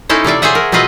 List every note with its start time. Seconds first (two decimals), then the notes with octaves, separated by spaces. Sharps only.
0.09 C#4 D#4 E4 A4 C5
0.24 C3 F4 D5 E5
0.42 G#4 C5 C#5 E5 F#5
0.55 A#4
0.72 B2 F#3 C4 F4 B4 D#5